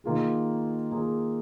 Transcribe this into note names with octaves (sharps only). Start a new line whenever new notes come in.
D#3 A#3 F4 G#4
D#3 A#3 F4 G#4